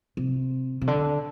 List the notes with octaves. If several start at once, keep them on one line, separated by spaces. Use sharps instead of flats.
C3
C3
D3